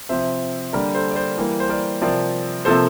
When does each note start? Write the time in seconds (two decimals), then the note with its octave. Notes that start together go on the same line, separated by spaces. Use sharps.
0.09 C3 F3 C4 C5 E5
0.73 D3 G3 A#3 A#4 D5
0.95 A4 C5
1.11 D5
1.16 A4 C5
1.38 E3 G3 A#3
1.60 C5
1.69 A#4 D5
2.01 C3 F3 C4 A#4 D5
2.65 C3 F3 A#3 A4 C5